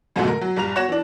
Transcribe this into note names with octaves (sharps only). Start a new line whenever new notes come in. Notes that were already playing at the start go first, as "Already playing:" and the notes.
F2 G#2 B2 D3 F#3 A3
A#4
F#3
A#1 G2 A#5 F7
F#4 C#5 F#6 A#6 E7
E3 D4